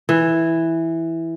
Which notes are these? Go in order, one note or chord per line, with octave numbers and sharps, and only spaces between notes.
E3